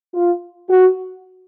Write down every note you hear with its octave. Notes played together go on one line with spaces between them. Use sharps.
F4
F#4